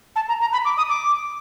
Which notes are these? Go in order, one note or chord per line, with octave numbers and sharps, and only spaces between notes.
A5
A#5
A#5
B5
D6
D#6
D6